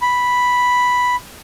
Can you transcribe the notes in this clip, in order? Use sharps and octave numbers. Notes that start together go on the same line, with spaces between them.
B5